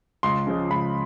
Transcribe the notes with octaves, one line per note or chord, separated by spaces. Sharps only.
C#2 C6
C#3 F3 G#3
C#2 B5